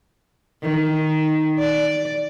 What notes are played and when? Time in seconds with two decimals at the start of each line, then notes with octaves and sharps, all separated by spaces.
0.62 D#3
1.59 D5